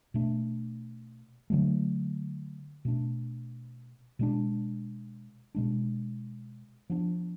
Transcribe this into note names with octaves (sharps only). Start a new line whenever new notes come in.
B2 A3 D4
D3 F#3 A3
B2 A3 D4
B2 G#3 D4
B2 G#3 D4
F3 B3 D4